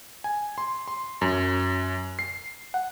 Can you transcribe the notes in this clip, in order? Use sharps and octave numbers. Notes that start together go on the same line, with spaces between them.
G#5
C6
C6
F#2
C7
F#5